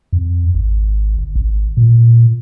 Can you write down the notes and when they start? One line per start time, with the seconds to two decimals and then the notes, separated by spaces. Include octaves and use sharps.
0.13 F2
0.54 G#1
1.18 G1
1.36 G#1
1.77 A#2